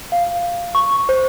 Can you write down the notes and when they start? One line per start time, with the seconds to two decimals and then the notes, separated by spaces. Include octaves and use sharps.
0.12 F5
0.75 C#6
1.09 C5